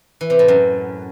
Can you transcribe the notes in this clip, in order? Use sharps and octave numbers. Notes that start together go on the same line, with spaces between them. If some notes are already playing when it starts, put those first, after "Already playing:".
E3
C3
A2
F#2